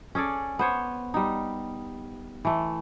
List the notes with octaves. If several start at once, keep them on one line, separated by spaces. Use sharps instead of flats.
C#4 G#4 A4 D5
B3 C5 C#5
G3 D#4
E3 A3